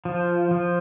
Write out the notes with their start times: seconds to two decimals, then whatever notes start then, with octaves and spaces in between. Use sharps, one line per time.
0.05 F3
0.51 F3